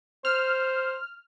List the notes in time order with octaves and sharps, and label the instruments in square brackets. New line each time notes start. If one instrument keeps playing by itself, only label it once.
[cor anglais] C5 [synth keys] F6